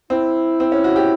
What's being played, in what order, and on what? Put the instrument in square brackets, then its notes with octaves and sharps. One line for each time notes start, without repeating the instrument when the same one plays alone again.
[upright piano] C4 [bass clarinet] E4
[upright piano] C4
C#4
F#4
G4